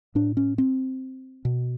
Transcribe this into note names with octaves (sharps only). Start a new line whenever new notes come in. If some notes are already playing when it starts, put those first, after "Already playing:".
A2 D4
C#4
C4
B2